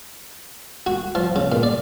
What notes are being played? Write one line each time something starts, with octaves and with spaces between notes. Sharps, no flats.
F#4
F3
C#3
A#2
D5